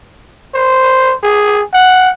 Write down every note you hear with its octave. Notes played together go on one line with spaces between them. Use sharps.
C5
G#4
F#5